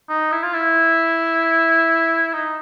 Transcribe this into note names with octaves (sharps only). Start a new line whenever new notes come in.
D#4
E4
F4
E4
D#4